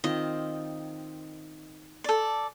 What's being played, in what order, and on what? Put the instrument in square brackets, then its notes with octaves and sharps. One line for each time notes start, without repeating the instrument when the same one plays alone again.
[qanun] D#3 C4 F4 [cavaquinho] D#5
[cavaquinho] A4 D5